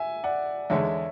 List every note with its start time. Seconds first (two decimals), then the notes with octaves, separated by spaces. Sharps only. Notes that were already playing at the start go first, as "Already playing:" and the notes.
Already playing: E5 G#5
0.23 D5 F#5
0.70 E2 D3 G#3 C#5 E5